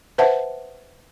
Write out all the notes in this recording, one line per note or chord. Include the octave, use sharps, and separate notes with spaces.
B4 C5 E5 F#5 A5